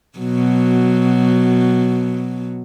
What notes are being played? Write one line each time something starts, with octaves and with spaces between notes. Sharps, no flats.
B2 F#3